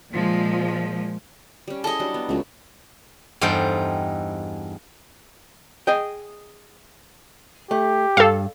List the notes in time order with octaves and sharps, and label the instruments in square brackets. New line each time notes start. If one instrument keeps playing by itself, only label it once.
[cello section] A#2 F3 G#3
[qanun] G3 C#4
[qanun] E4 G#4 C#5 [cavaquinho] A4 D#5
[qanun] F#3 G3 D4
B3
[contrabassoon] C#2 [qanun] F#3 A3
[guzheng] E2 G2 D#4 A4 C5 G5
[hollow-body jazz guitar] G#4 D#5 G5
[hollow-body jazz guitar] A3 [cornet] G4
[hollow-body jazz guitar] G2 [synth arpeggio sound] A4 F5